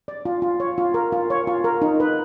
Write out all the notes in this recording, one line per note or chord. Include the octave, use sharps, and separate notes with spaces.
D5
F4
F4
C#5
F4
A#4
F4
C#5
F4
A#4
D#4
B4